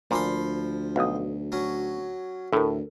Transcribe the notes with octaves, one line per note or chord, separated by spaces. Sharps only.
D2 A#2 F3 B5 C6
B1 F5 D#6
F#3 C#4
D2 A2 A4 A#4